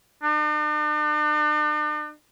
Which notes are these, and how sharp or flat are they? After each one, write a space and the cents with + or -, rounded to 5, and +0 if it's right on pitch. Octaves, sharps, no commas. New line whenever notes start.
D4 +45